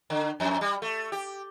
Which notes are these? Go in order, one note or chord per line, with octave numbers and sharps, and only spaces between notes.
D3
F2
G3
A3
G4